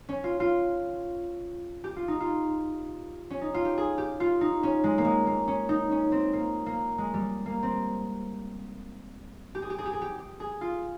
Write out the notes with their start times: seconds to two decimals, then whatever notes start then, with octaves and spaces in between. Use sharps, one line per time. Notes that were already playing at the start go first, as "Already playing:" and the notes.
0.09 C#4
0.24 F4
0.40 F4
1.84 G4
1.96 F4
2.08 D#4
2.20 F4
3.30 C#4
3.41 D#4
3.54 F4
3.65 G4
3.78 G#4
3.98 G4
4.20 F4
4.41 D#4
4.63 C#4
4.84 G#3
4.98 A#3
5.05 G#3
5.27 A#3
5.48 C#4
5.69 D#4
5.91 C#4
6.12 C4
6.33 A#3
6.66 A#3
6.98 G#3
7.14 G3
7.46 A#3
7.63 C4
9.55 G4
9.62 G#4
9.70 G4
9.78 G#4
9.85 G4
9.93 G#4
10.02 G4
10.18 G4
10.40 G#4
10.61 F4